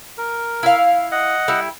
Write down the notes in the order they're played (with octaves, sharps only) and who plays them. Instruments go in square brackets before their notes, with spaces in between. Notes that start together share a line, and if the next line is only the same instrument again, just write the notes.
[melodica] A#4
[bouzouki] E4 F5
[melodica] D#5 F#5
[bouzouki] G3 E4